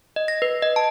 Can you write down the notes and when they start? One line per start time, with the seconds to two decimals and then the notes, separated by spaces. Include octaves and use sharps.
0.16 D#5
0.28 A#6
0.42 B4
0.62 D#5
0.76 A5